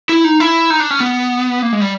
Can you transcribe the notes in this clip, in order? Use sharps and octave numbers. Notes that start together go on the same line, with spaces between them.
E4
D#4
E4
D#4
D4
C#4
B3
A#3
G#3
G3